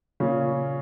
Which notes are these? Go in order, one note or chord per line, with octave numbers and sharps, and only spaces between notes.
A#2 C#3 C#4